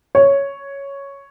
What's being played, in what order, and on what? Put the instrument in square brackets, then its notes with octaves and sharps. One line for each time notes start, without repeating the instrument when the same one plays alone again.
[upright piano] C#5